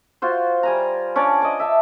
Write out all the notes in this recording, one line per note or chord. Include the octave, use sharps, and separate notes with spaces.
F4 F#4 C5
G3 G#5 A#5
C#4 D4 C#5 D5
D#5 D6
E5 A5